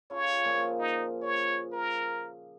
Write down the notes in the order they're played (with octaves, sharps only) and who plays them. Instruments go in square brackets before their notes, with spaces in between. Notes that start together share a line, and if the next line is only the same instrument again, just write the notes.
[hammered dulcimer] C#3 F4 A4 [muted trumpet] C#5
[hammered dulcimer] A#2 F3
[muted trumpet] D#4
C#5
A#4